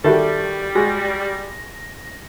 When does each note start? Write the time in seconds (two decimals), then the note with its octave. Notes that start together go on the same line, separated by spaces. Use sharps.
0.04 D#3 G3 E4 F#4 A4
0.75 G#3 F#4 A#6